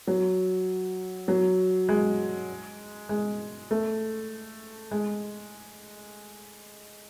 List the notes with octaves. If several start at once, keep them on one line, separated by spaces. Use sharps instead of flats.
F#3
F#3
G#3
G#3
A3
G#3